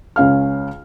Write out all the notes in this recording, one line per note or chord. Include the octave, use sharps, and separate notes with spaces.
C#2 C#4 F5 F6